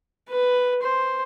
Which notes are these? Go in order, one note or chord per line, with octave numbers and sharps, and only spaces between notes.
B4
C5